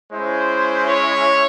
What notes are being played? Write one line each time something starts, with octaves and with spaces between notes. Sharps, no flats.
G#3 C#4 E4 C5
C#5